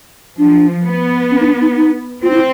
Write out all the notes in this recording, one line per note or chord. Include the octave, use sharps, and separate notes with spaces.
F3 D4
B3
C#4
D#4
D4
D#4
D#4
C4 F4
D#4
E4